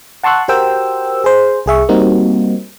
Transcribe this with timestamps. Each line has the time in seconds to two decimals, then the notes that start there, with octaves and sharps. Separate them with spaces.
0.24 F#5 A5 C6 C#6 E6 F#6
0.48 F#4 G4 A#4 C5 G5 E6
1.24 G#4 C5
1.66 C2 G#4 E5 C#6
1.89 G3 A#3 C4 D#4 F#4